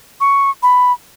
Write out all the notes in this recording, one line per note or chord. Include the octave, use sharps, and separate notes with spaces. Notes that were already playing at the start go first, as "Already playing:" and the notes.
C#6
B5